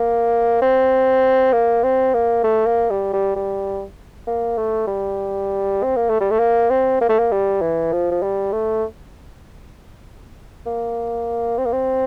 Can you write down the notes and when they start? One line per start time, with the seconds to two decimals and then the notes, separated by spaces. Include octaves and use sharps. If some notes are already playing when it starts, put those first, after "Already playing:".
Already playing: A#3
0.62 C4
1.52 A#3
1.84 C4
2.14 A#3
2.44 A3
2.66 A#3
2.90 G3
3.13 G3
3.36 G3
4.27 A#3
4.58 A3
4.87 G3
5.83 C4
5.96 A#3
6.10 A3
6.21 G3
6.31 A3
6.40 A#3
6.70 C4
7.01 A#3
7.09 A3
7.19 A#3
7.32 G3
7.61 E3
7.93 F3
8.11 F3
8.23 G3
8.53 A3
10.66 A#3
11.58 C4
11.65 A#3
11.72 C4